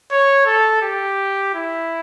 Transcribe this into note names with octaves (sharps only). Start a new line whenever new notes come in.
C#5
A4
G4
E4